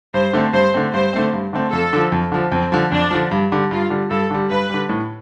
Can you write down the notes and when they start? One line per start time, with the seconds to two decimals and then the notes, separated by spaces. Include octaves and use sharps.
0.14 G2 C5
0.33 D3 A3 C4
0.53 G2 C5
0.74 D3 A3 C4
0.93 G2 C5
1.13 D3 A3 C4
1.33 G2
1.53 D3 A3 C4
1.72 F2 A4
1.93 D3 F3
2.12 F2
2.32 D3 F3
2.52 F2 C4
2.72 D3 F3
2.91 F2 D4
3.11 D3 F3
3.31 G2
3.52 D3 G3
3.71 G2 F4
3.90 D3 G3
4.11 G2 A4
4.31 D3 G3
4.50 G2 B4
4.69 D3 G3
4.89 A2